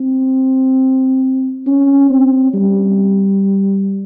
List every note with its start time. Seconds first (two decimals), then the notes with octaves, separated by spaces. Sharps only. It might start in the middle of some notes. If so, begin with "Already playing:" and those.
Already playing: C4
1.67 C#4
2.10 C4
2.54 G3